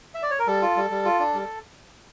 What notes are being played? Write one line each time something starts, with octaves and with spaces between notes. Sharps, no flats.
E5
D5
C#5
A#4
G3 A4
F4
G3
G3
F4
D4
G3